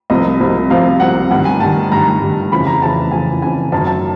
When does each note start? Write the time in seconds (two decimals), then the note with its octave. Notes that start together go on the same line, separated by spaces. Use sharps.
0.10 C2 C3 F3 D#5
0.40 C2 C3 F3
0.70 C2 C3 F3 F5
1.00 C2 C3 F3 F#5
1.31 G2 D#3 F#5
1.45 G#5
1.60 G2 D#3 A5
1.91 G2 D#3 A#5
2.21 G2 D#3
2.51 F2 C#3 E3 B5
2.67 A#5
2.81 F2 C#3 E3 A5
3.12 F2 C#3 E3 G#5
3.42 F2 C#3 E3 G#5
3.72 F#2 D#3 A5
3.87 A5